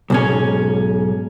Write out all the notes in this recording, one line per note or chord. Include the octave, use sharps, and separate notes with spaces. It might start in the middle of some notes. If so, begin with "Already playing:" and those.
B1 G#2 C#4